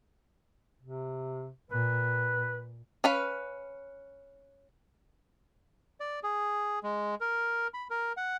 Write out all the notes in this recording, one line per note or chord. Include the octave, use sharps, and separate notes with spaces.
C3
A#2 B4
C#4 B4 F5
D5
G#4
G#3
A#4
B5
A#4
F#5